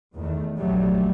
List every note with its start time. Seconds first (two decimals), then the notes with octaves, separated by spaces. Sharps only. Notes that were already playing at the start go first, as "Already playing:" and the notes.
0.15 E2 D#3 A3
0.58 A#1 C3 F#3 G3 A3